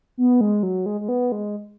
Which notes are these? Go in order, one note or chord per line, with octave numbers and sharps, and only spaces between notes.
B3
G#3
F#3
G#3
G#3
B3
G#3